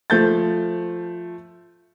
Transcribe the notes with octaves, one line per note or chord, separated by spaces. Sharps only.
F3 A3 G6 A6